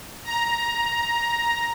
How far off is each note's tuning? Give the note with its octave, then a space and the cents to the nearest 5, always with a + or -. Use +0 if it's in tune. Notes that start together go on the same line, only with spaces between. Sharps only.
A#5 +10